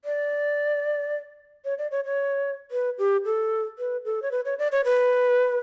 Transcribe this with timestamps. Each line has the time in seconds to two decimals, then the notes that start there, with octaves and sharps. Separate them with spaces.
0.05 D5
1.65 C#5
1.78 D5
1.91 C#5
2.05 C#5
2.71 B4
2.98 G4
3.25 A4
3.79 B4
4.05 A4
4.22 C#5
4.31 B4
4.45 C#5
4.59 D5
4.72 C#5
4.85 B4